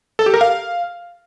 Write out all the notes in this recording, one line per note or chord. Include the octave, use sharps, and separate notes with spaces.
A4
G4
A#4
F5